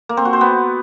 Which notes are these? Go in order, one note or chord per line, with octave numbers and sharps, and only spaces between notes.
A#3
C4
F#4
C5
B3